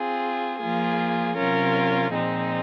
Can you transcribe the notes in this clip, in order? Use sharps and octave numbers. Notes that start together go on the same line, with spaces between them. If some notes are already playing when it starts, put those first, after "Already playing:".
Already playing: C4 F4 G#4
F3 A#3 F4 G#4
C3 F#3 C#4 F4 A#4
A#2 F3 G#3 C4 D#4